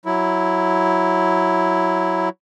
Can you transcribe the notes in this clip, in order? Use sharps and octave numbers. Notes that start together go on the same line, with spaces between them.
F#3 E4